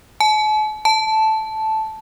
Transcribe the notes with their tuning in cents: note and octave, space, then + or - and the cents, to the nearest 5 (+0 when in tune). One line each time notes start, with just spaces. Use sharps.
A5 -45
A5 -5